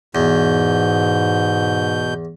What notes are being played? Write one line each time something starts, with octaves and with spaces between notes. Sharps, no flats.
E2 G#2 B2 G6